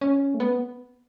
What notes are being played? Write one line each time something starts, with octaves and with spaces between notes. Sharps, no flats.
C#4
A3
B3